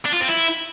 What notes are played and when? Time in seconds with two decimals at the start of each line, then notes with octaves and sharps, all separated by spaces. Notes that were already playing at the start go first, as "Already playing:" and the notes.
0.05 D4
0.13 F4
0.21 C4
0.28 E4